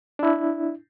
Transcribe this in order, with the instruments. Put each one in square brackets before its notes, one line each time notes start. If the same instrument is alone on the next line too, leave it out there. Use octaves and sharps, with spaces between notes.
[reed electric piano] D4 E4